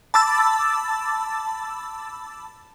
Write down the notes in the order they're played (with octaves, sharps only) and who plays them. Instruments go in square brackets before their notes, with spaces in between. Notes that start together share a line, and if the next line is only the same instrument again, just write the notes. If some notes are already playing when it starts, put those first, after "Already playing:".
[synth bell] A5 B5 D6 E6 A6